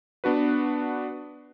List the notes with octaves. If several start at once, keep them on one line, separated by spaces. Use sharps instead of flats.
B3 D4 F#4 B4